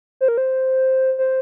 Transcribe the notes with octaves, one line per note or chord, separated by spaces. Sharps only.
C5
A#4
C5
C5